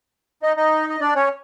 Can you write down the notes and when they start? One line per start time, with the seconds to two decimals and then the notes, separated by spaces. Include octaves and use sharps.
0.43 D#4 D#5
0.56 D#4 D#5
0.89 D#5
1.00 D4 D5
1.16 C#4 C#5